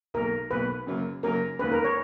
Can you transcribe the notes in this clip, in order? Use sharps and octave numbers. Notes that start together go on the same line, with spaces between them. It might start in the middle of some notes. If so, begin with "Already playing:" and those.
B1 B2 A#3 A#4
B1 B2 A#3 B4
F#2 C#3 F#3 A#3
F#2 C#3 F#3 A#3 A#4
E1 D#2 D#3 A#3 C#4 B4
A#4
C#5